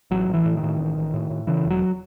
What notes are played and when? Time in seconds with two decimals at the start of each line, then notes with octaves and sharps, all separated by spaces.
0.11 A1 F#3
0.28 A1
0.34 E3
0.45 A2
0.57 D#3
0.63 A2
0.79 A1
0.97 A1
1.14 A2
1.30 A2
1.47 C#3 E3
1.65 E1
1.70 F#3